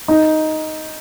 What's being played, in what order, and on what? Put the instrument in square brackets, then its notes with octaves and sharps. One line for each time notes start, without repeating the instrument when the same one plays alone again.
[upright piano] D#4